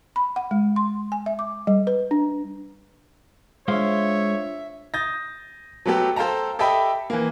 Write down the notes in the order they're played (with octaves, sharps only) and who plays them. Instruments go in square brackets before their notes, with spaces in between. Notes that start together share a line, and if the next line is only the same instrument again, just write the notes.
[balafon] B5
F#5
G#3
C6
G#5
E5
D6
G3
B4
D4
[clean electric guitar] G#3 C5 F5 [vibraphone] D4 F4 [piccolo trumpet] C#5 [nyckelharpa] E5
[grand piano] D#6 G6 A6 A#6
F#3 A3 B3 G4 A4
A4 C5 F5 G5 A5 A#5
G4 A4 D#5 E5 G5 B5
E3 A#3